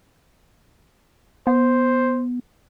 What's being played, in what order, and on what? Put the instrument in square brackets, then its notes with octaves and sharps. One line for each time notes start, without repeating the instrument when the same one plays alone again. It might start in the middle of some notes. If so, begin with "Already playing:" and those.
[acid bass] B3 [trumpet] C5